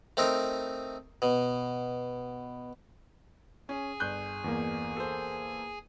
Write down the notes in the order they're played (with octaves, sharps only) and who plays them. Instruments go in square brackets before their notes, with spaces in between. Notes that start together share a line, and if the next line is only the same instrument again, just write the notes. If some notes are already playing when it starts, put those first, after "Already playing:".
[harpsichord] A3 C4 D#4 A#4
B2
[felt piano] C#4 [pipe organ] G#4 G#5
[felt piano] G1 F#6 G6
[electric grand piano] E2 A#3
[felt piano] A4 C5